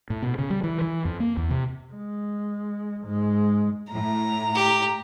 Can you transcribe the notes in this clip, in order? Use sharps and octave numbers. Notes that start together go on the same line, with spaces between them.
A2
B2
C#3
G3
E3
E3
F2
A#3
E2
C3
G#3
G#2 G#3
A2 A#5
G4